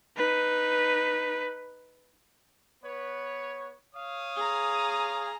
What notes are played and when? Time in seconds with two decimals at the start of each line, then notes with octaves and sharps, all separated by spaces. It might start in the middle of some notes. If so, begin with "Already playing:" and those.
0.17 D#4 B4
2.83 B3 B4 C#5
3.94 C#5 F5 D#6
4.36 G#4 A#5